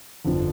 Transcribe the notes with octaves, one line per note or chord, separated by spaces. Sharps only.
G1 F2 D3 F3